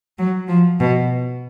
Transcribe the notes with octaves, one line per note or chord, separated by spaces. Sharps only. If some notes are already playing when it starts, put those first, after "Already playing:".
F#3
F3
B2